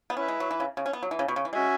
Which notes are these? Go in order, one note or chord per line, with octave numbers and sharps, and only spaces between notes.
B3
C#4 E4 B4 E5
G#3
F#3
E3
C#3
C#3
C#4
B3
F#3
E3
C#3
B2
C#3
E3
G#3 C#4 F#4 E5 G#5